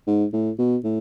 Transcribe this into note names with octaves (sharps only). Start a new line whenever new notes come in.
G#2
A2
B2
A2